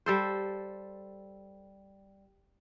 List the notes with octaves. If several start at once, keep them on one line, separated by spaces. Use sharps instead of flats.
G3 A4 C5